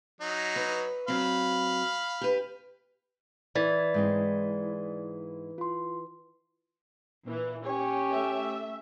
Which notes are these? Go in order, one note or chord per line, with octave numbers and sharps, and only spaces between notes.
F#3 D#4
B4
F#3 C4 F5 B5
G4 B4
E3 D5 G#6 A6
G#2 G#3 C4
F4 C6
A#2 E3
C#4 G4 C#5
A3 E5